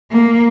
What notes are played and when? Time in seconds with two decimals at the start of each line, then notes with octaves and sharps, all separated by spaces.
0.12 A#3